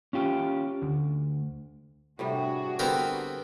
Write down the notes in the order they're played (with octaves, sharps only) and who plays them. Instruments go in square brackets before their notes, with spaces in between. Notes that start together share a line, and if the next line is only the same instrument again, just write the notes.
[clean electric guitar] C#4 F4 G4
D2
[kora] A2 C3 G3 [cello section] D4 F#4 G#4
[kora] D3 G3 G4 [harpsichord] B3 C4 A#4